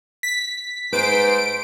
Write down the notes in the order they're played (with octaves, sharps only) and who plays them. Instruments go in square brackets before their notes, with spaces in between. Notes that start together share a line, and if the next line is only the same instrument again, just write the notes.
[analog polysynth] B6
[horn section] G#2 C5 [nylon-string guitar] B4 [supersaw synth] D7